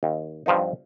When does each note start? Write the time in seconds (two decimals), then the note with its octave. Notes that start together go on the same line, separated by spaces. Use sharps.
0.03 D#2
0.46 G2 F3 B3 D#4